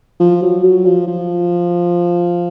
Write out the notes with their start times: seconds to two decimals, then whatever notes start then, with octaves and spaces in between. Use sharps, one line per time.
0.20 F3
0.42 F#3
0.64 F#3
0.86 F3
1.07 F3